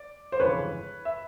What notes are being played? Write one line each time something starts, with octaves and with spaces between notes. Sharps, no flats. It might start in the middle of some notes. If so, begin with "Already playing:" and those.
Already playing: D5
C5
G1 F2 C#3 E3 G#3 B4 C#5
E5